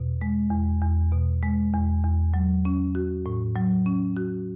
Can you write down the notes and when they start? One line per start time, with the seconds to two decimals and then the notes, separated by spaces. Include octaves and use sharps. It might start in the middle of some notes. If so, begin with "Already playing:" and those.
Already playing: E2 B2
0.21 G#3
0.51 E2
0.82 E2
1.12 B2
1.43 G#3
1.74 E2
2.04 E2
2.34 F#3
2.65 C#4
2.95 F#4
3.26 A2
3.56 F#3
3.86 C#4
4.17 F#4